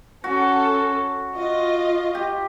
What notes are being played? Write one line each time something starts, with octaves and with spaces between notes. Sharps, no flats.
C#4 F#4 A4
F4 D#5
G4